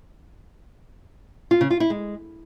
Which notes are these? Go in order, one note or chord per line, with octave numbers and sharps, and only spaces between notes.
F4
C#3
F4
E4
G#3